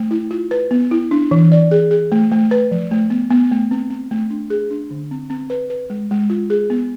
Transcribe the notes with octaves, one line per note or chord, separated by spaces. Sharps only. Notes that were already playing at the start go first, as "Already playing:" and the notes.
Already playing: A3
E4
F4
B4
B3
E4
D4
E3
D5
G#4
G#4
A3
A3
B4
F3
A3
B3
B3
A3
C4
C4
A3
D4
G#4
D4
D3
C4
C4
B4
B4
G#3
G#3
F4
G#4
B3